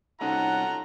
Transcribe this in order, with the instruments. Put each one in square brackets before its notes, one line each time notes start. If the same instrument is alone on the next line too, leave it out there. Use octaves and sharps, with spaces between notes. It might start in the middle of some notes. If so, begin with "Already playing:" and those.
[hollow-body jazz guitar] C2 C#4 D#4 [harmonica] F4 F#4 A4 [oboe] F#5 [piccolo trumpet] A#5